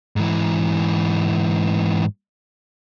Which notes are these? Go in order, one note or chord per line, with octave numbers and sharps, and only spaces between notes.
G#2 E3